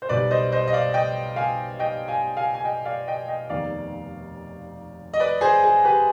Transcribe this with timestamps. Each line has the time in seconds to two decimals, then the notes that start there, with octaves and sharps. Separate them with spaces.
0.02 C5
0.09 B1 B2 G3 B3 B4 D5
0.31 C5 D#5
0.52 C5 D#5
0.67 D#5
0.73 D5 F5
0.94 D#5 G5
1.36 F5 G#5
1.79 D#5 G5
2.08 F5 G#5
2.37 F5 G#5
2.54 G#5
2.64 D#5 G5
2.85 D5 F5
3.07 D#5 G5
3.28 D#5 G5
3.49 F1 D#2 D#3 B3 D5 F5
5.14 D#5
5.20 B4 D5
5.41 G#4 C5
5.63 G#4
5.85 G4 B4